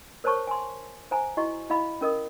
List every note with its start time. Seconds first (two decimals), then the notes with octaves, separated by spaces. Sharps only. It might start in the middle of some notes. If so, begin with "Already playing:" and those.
0.24 A#4 C5 C#5 A5 C#6
0.47 G#5 C6
1.11 C5 F5 G#5 A#5
1.37 E4 F#4 D#5 C#6
1.70 E4 D#5 F5 B5
2.01 C#4 A#4 D#5 D#6